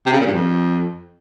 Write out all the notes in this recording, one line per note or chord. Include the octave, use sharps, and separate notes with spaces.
C3
C#3
A#2
G2
F2